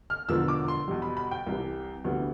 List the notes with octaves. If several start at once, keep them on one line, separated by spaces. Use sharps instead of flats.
F6
E1 E2 D3 F3 B3 E6
D6
C6
E2 B2 G3
B5
B5
G5
C2 C3 E3 G3
D2 C3 E3 G3 B3